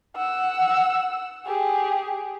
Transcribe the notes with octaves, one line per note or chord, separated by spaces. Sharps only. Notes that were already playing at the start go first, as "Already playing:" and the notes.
F#5 E6
G4 G#4